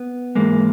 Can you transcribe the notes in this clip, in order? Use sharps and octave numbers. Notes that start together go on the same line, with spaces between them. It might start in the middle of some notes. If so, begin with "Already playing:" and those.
Already playing: B3
G#2 E3 G#3 A#3